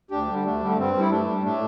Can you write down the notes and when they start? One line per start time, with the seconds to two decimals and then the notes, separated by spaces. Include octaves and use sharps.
0.11 D2 D4 G4
0.28 D3 G3
0.44 D2 A3 D4
0.61 D3 G3 A3
0.77 G2 G3 C4
0.93 G3
1.00 E4
1.10 G2 A3 D4
1.26 G3
1.43 A2 A3 D4